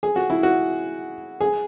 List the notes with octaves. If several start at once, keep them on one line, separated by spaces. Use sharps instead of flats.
G#4
F#4
E4
F#4
G#4